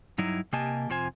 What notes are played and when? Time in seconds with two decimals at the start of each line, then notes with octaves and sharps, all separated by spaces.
0.18 G2 F#3 D#4 E4
0.53 C3 A#3 G4 D#5 G#5 A5
0.89 F2 C3 F4 C5 G#5